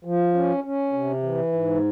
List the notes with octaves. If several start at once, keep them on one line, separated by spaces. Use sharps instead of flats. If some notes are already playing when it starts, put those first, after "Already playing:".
F3
C#4
C#4
C3
E3
G#2